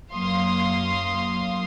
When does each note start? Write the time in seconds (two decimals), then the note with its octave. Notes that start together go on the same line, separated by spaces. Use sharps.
0.10 F#2 F#3 A#3 F5 C6 D#6